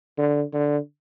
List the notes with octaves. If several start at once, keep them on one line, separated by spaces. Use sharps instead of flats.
D3
D3